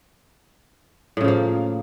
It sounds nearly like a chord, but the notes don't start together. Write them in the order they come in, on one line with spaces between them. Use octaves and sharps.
A2 C#3 F3 A#3